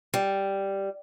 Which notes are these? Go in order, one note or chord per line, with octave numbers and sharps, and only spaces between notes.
G3